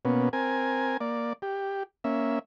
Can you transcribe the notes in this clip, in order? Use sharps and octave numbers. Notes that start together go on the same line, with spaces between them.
B2 A#3 B3 C#4
C4 A#4 G#5
A#3 D5
G4
A#3 C#4 E5